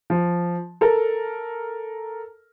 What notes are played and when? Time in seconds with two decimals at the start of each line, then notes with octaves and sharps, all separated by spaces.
0.10 F3
0.81 A4 A#4